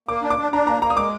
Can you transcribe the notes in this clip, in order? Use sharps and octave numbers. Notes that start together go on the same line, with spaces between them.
A#3 D6
D4
D6
D4
D4 A#5
A#3 A#5
A#3 A#5
D#6
G#3 D6